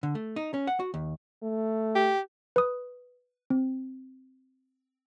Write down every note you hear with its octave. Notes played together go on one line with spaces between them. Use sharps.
D3
A3
D#4
C#4
F#5
F#4
D#2
A3
G4
B4 D#6
C4